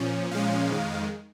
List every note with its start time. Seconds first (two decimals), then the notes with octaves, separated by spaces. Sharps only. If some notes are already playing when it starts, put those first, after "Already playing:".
Already playing: A#2 F3 C#4
0.31 A#2 F3 G#3 C#4 F5
0.69 F2 D#3 G#3